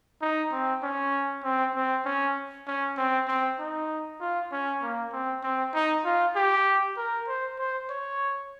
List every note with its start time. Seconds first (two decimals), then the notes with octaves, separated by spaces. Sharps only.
0.22 D#4
0.52 C4
0.82 C#4
1.44 C4
1.75 C4
2.05 C#4
2.67 C#4
2.97 C4
3.28 C4
3.59 D#4
4.21 F4
4.52 C#4
4.82 A#3
5.12 C4
5.43 C4
5.74 D#4
6.05 F4
6.35 G4
6.97 A#4
7.28 C5
7.59 C5
7.90 C#5